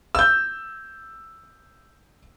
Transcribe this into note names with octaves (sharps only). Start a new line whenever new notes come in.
E6 G6